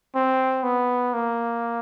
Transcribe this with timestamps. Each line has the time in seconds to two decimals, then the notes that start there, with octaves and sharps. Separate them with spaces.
0.15 C4
0.63 B3
1.14 A#3